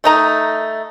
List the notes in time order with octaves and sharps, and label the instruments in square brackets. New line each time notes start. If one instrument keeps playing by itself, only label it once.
[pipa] A3 D#4 A#5